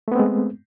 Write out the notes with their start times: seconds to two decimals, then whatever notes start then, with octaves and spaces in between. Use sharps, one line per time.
0.08 A3
0.12 B3
0.15 C4
0.19 G#3